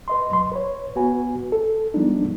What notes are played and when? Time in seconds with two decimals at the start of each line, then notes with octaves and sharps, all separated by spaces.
0.08 B4 D#5 C6
0.30 E2 F#3 C6
0.51 B4 C#5
0.96 B3 F#4 B4 G#5
1.52 A4
1.94 F3 G3 G#3 B3 D4 D#4